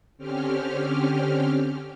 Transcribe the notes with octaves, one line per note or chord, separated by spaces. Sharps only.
D3 C4 C#4 G4 F6